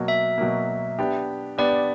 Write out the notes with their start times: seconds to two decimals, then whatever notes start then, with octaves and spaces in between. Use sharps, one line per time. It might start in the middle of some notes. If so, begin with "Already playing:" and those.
Already playing: B2 F#3 A#3
0.08 E5
0.38 B2 F#3 A#3
0.99 B3 D4 G4
1.58 B3 D4 G4 D5